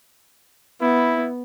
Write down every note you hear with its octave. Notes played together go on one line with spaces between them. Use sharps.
B3 E4